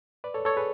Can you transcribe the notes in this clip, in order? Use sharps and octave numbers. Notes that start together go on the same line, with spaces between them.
B4 D5
A4 C#5
A4 C#5
G#4 B4